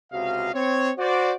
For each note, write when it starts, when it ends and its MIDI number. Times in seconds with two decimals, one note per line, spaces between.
0.13 0.51 37
0.13 0.51 48
0.13 0.51 66
0.13 0.51 75
0.13 0.51 77
0.54 0.91 60
0.54 0.91 73
0.98 1.35 66
0.98 1.35 72
0.98 1.35 74